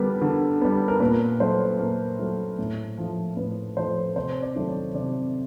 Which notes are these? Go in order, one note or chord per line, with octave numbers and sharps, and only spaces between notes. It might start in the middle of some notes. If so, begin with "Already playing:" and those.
Already playing: D3 G3 B3 A#4 B4
D3
G3 B3
A#4
A#2 B4
F#3 A3 C5
A#2 A#4
F#3 A3
A2
F3 A3
A2 B4
F3 A3 C5
C3 C5
D5
D#3 F#3 A3
C#5
C3 D5